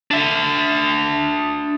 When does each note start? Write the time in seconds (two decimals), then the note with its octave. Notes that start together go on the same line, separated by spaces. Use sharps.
0.11 D4 E5